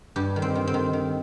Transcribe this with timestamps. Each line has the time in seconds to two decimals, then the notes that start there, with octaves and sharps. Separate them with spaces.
0.16 G2 G4
0.36 D#3
0.42 C4
0.55 D#3
0.67 C4
0.74 D#3
0.93 D#3